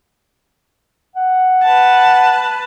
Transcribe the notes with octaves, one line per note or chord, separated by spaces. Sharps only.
F#5
B4 A5